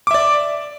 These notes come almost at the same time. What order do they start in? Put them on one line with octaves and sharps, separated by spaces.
D6 E5 D5